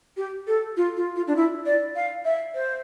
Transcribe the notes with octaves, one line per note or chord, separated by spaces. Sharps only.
G4
A4
F4
F4
F4
D4
E4
D5
F5
E5
C5